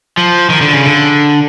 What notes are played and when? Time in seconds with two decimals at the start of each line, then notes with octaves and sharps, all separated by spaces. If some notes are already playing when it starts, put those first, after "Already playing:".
0.17 F3
0.50 D#3
0.61 D3
0.73 C#3
0.85 D3